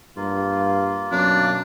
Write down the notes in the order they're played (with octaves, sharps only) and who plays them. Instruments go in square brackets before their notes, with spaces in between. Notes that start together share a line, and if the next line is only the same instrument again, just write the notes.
[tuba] G2 [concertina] A#3 F4
[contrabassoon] F#2 [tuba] B2 [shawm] D4